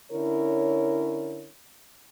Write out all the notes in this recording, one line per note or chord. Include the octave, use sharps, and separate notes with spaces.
D3 C#4 E4 A#4 C#5